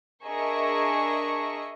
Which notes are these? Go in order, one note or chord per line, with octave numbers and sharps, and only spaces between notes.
D4 G#4 A#4 D#5 E5 C#6